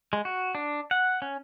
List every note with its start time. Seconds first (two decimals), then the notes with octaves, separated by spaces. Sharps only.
0.13 G#3
0.25 F#4
0.55 D4
0.91 F#5
1.22 C#4